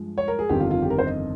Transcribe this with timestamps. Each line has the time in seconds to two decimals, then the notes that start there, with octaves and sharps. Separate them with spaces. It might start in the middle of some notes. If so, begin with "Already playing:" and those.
Already playing: G2 F3 G#3
0.18 C#5
0.28 A#4
0.39 G#4
0.49 G1 F2 D#3 G4
0.60 F4
0.71 F4
0.82 G4
0.90 A#4
0.99 C5
1.06 D#5